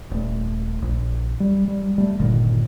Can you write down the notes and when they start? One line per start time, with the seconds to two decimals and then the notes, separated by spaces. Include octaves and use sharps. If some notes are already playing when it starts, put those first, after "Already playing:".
0.11 D#1 A3
0.82 A#1
1.40 G3
1.68 G3
1.98 G3 A3
2.19 G1 A#2 D3 D#3